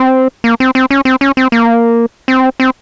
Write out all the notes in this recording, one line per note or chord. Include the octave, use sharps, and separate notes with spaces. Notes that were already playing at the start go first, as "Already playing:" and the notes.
Already playing: C4
A#3
C4
C4
C#4
C4
C#4
C4
A#3
C4
C4